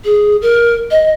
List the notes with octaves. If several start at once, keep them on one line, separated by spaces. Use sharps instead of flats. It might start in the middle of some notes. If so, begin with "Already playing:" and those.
G#4
A#4
D#5